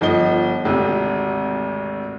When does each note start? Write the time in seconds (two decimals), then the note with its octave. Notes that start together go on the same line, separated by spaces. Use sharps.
0.01 G1 F3 D#5 G7
0.65 G#1 D2 C3